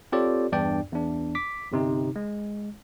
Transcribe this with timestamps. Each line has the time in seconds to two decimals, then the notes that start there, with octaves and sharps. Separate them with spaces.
0.12 C4 F4 G4 A4 C#5 D5
0.52 E2 G2 D4 D5 G5
0.93 E2 D4
1.35 D6 B6
1.72 G1 C3 D#4
2.16 G#3